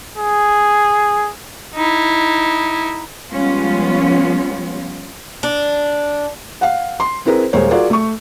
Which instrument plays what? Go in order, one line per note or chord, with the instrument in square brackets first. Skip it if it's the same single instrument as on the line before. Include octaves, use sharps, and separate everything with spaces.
[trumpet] G#4
[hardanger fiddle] D#4 E4
[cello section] F3 G3 G#3 B3 C#4 F4
[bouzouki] D4
[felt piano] F5 F#5
C6
C4 E4 G#4 A#4 B4
D#1 G#3 A#3 C5 C#5
F4 F#4 G#4 A#4 D5
A3 C#6